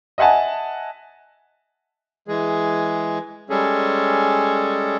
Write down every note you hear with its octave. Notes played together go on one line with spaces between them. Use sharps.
D#5 E5 F#5 G#5 A5
E3 G#3 G#4
G3 G#3 C#4 G#4 A4